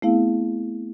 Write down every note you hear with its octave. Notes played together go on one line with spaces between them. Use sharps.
A3 B3 C4 E4 G#4 F5